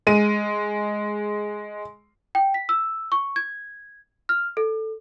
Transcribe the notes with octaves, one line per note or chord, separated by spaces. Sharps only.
G#3 D#7
G5
B6
E6
C#6
G#6
F6
A4